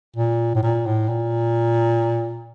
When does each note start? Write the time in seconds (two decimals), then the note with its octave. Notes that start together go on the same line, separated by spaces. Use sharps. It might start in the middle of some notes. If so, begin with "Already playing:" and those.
0.17 A#2
0.55 A2
0.63 A#2
0.86 A2
1.09 A#2